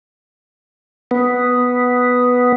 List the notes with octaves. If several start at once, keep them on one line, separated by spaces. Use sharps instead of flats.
B3